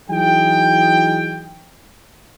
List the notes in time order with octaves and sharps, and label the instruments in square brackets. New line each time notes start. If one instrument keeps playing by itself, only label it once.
[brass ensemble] E3 F#3 D#4 G#4 G5